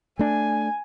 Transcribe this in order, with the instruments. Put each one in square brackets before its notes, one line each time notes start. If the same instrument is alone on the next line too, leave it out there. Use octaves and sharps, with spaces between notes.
[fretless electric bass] A3 D4 [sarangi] G#5